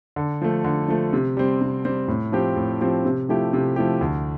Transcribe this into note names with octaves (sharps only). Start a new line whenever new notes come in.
D3
F3 A3
D3
F3 A3
C3
G3 C4
C3
G3 C4
A2
F3 C4 G4
A2
F3 C4 G4
C3
F3 A3 E4 G4
C3
F3 A3 E4 G4
D2